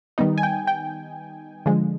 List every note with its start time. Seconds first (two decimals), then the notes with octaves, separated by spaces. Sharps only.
0.18 D#3 G3 B3 D#4
0.38 G#5
0.43 G5
0.67 G5
1.66 D3 F3 G#3